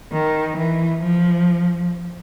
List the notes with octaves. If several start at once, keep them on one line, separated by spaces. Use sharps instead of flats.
D#3
E3
F3